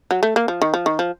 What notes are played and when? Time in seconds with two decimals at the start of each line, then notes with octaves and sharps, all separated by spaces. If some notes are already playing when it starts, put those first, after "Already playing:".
0.11 F#3
0.23 A3
0.36 A#3
0.48 F3
0.62 D#3
0.74 F3
0.86 D#3
0.99 F3